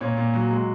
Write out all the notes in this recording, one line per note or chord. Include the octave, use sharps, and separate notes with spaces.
A#2 C#5
A#2
F#3
G#3